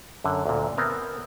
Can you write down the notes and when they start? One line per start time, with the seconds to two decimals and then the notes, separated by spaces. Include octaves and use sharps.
0.24 F#2 D3
0.46 D2 A#2
0.77 B3 C4 A#4 G#5